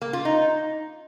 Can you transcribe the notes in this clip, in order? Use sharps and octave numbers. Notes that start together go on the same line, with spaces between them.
A#3
F4
D#4